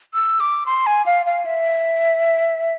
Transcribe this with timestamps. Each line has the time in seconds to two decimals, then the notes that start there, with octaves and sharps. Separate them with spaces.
0.14 E6
0.40 D6
0.66 C6
0.87 G#5
1.06 F5
1.26 F5
1.46 E5